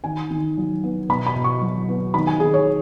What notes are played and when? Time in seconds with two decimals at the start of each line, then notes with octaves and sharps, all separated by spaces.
0.04 D#3 G#5
0.30 D#3
0.57 F#3
0.84 B3
1.09 B2 B5
1.27 B5
1.36 B2
1.44 C#6
1.62 F#3
1.89 B3
2.14 D#3 B5
2.27 G#5
2.40 D#3 G#4
2.54 C#5